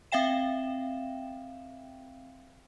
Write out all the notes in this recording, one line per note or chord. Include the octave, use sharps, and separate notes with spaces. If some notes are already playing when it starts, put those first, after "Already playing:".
C4 E5 F5 G5 E7